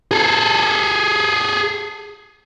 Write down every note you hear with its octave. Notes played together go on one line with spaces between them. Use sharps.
G#4 A4